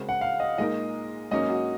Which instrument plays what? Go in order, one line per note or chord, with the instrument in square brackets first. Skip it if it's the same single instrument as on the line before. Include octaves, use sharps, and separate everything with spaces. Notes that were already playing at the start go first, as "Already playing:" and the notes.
Already playing: [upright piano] C#3 G#3 C4 F#4 A#4
[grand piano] F#5
F5
D#5
[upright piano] A#2 G#3 D#4 A#4 [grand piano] D#5
[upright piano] G#2 F#3 A#3 C#4 [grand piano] D#5
[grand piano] F#4